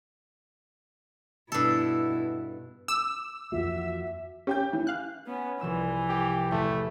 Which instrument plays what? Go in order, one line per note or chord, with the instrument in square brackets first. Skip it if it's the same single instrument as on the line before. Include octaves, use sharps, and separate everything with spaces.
[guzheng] G2 A4 [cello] B2 E4
[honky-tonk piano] D6 [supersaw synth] E6
[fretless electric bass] F2 E3 A#3 [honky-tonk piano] F4 F#4 [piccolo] E5
[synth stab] C#4 [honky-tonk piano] G4 G5 G6
[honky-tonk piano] E3
[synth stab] F5 F#6
[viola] B3 C#4
[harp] C2 F3 E6 [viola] E3
[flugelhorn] G4
[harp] A1 E2 B5 [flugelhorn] A3